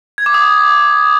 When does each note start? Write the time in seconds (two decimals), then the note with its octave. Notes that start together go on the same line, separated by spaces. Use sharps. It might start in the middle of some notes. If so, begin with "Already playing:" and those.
0.18 G#6
0.26 D6
0.34 D#6